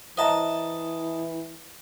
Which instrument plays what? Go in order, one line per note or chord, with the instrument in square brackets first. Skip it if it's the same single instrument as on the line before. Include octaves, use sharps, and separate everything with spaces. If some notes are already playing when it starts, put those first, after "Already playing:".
[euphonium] E3 [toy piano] C5 E5 A#5 [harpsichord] D#5 A5